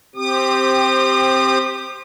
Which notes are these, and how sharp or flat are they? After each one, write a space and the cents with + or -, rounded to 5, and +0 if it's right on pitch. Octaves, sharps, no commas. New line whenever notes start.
C4 +0 G4 +0 D#6 -40